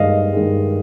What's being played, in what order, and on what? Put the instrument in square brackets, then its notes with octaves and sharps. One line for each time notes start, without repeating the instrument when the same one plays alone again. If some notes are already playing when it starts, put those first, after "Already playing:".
Already playing: [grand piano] G2 D#3 G#3 D#5 F5
G2 D#3 G#3